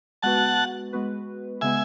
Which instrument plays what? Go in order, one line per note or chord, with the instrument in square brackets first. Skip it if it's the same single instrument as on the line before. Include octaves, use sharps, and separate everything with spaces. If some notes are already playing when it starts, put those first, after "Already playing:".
[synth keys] G#3 B3 F#4 B4 [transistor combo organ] F#5 A5
[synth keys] G#3 B3 F#4 B4
[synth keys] C#3 G#3 B3 [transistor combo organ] E5 G#5